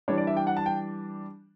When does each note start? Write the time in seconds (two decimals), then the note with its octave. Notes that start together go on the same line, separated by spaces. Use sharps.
0.08 E3 G3 D4 C#5
0.18 D5
0.27 E5
0.37 G5
0.47 F#5
0.57 A5
0.66 G5